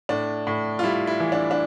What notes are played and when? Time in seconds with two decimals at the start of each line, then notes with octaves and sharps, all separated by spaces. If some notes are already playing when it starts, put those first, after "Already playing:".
0.09 A2 D4
0.47 A2
0.79 F4
0.84 G3 E4
1.07 E4
1.20 E3
1.32 D4
1.51 D4